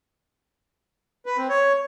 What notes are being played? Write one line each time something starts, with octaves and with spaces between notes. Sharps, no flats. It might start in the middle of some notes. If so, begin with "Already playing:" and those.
B4
C4
C#5